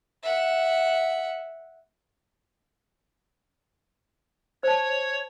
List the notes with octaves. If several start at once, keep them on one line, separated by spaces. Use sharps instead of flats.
E5 F#5
C5 C#5 A5